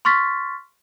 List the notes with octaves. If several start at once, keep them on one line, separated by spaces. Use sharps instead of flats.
C6 C#6 F6 A6 B6